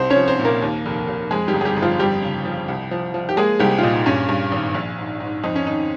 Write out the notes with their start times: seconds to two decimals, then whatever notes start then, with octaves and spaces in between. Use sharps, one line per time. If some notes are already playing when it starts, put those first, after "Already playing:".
Already playing: C2 C4 C5
0.10 C#4 C#5
0.16 F3
0.28 C4 C5
0.39 A#2
0.45 A#3 A#4
0.62 D#2
0.85 F1
1.08 F1
1.31 F2 G#3 G#4
1.48 G3 G4
1.54 G1
1.61 G#4
1.65 G3 G4
1.76 G1
1.82 F3 F4
1.99 F2 G3 G4
2.22 C#3
2.45 F3
2.68 C2
2.91 F3
3.14 F3
3.29 G4
3.37 G#3 A#3 G#4
3.59 C2 G3 G4
3.78 F4
3.83 A#2 D#4
4.06 G2 C#4
4.29 G2
4.52 G#1
4.74 A#1
4.98 G#2
5.20 G#2
5.43 F2 D#4
5.55 C#4
5.66 D#3 D#4